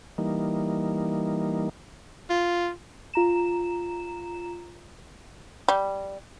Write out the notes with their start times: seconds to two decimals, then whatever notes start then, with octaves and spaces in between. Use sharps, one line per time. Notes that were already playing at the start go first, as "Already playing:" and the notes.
0.18 E3 G3 A#3 D#4
2.30 F4
3.14 F4 A#5 E7
5.68 G3